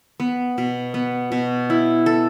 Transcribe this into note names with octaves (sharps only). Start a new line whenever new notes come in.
B3
B2
B3
B2
E4
A4